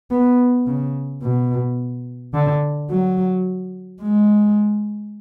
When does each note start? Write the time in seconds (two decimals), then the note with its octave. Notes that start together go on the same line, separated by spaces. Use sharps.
0.11 B3
0.67 C#3
1.22 B2
2.34 D3
2.91 F#3
4.03 G#3